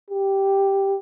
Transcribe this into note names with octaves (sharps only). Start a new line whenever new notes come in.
G4